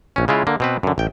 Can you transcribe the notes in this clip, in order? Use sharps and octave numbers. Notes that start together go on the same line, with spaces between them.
A#1 C#4
C#3 G#3 E4 F4
D3 A#3
B2 C4 B4
F#2 D3
A1 G5